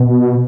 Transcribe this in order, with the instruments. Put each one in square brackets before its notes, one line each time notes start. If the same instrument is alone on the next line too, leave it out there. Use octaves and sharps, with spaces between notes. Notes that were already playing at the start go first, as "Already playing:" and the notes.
Already playing: [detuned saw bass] B2